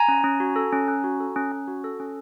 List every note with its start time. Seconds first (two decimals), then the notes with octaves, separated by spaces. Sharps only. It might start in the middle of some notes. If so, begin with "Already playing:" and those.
Already playing: G#5 A#5
0.08 C#4
0.24 C#4
0.40 F#4
0.56 A4
0.72 C#4
0.88 C#4
1.04 F#4
1.20 A4
1.36 C#4
1.52 C#4
1.68 F#4
1.84 A4
2.00 C#4